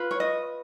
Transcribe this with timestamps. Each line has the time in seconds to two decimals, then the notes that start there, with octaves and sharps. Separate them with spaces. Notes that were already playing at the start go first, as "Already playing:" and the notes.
Already playing: F4 B4
0.11 C#5
0.20 D#5